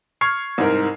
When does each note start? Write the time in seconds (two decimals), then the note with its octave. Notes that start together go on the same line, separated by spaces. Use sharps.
0.21 C#6 F6 G#6 C7
0.58 C2 G#2 A#4